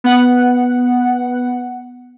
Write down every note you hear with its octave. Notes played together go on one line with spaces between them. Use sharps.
B3 F#5